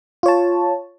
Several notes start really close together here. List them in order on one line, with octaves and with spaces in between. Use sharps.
F4 C#5 A5